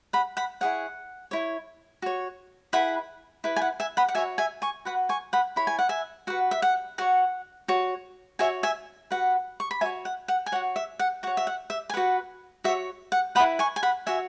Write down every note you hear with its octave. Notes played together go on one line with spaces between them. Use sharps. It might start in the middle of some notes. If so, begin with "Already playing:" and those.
F#5 B5
F#5 B5
E4 G#4 C#5 F#5
E4 C#5
F#4 C#5
E4 G#4 B4 F#5 B5
E4 B4
G#5
F#5
E5 G#5
F#5 B5
F#5
F#4 C#5 E5 G#5
E5 G#5
G#5 C#6
F#4 B4 F#5 B5
G#5 C#6
F#5 B5
E4 C#5 B5
G#5
F#5
E5 G#5
F#4 B4 F#5
E5
F#5
F#4 C#5 F#5
F#4 C#5
F#4 C#5 E5 G#5
E5 G#5
F#4 B4 F#5
C#6
B5
F#4 C#5 E5 G#5
F#5
F#5
G#5
F#4 C#5 F#5
E5
F#5
F#4 C#5 F#5
E5
F#5
E5
G#5
F#4 B4 F#5
F#4 C#5 E5
F#5
E4 B4 F#5 B5
G#5 C#6
G#5
F#5 B5
F#4 C#5 E5 G#5